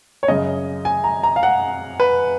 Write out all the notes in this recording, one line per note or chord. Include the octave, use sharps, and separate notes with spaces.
C#5
F#2 C#3 D#5
G#5
A#5
A#5
F5
F#5
B4